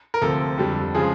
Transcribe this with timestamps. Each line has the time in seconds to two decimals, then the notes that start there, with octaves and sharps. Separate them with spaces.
0.14 A#4
0.21 D2 C3 F3 A4
0.58 F2 D3 G3
0.95 C#3 F3 G#3 G#4